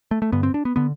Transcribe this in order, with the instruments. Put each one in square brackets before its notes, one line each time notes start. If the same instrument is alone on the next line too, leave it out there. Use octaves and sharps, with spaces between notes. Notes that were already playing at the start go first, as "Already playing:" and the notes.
[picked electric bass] A3
A3
G2 D3 B3
C4
D4
B3
D3 B3